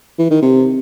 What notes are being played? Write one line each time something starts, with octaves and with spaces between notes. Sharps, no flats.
E3
D#3
C3